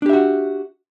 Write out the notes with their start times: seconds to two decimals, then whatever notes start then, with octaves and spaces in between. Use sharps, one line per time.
0.02 D4
0.06 G4
0.09 E5
0.13 F#4